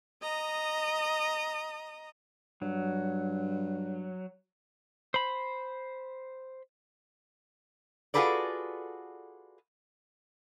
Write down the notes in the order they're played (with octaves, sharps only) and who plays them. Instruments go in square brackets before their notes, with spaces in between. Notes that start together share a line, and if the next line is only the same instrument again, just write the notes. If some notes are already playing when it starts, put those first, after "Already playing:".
[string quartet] D#5 A#5 D#6
[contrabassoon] G2 [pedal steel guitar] F#3
[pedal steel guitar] C5 B5
[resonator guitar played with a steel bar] F4 F#4 G#4 A4 B4 D5